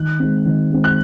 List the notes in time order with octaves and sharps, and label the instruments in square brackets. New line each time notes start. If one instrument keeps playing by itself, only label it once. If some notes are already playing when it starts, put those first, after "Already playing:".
Already playing: [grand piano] D#3 F#6
G#3 C4
D#3
G#3 C4
F#6